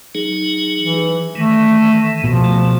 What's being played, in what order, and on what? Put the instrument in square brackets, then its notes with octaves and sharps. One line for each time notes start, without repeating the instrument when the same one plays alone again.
[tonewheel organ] F#3 D#4 G#4
[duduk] E3
[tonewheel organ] D#3 E3 [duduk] A3
[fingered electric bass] B2 [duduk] F3
[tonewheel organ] A3